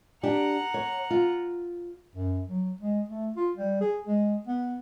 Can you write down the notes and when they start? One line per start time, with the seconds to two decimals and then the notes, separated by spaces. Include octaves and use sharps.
0.23 D4 G4 F#5 A#5
0.74 C#5
1.11 F4
2.16 F#2
2.49 F#3
2.81 G#3
3.08 A3
3.36 F4
3.55 G3
3.81 G#4
4.07 G#3
4.47 B3